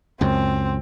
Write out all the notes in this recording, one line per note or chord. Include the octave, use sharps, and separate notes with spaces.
C#2 F#2 C4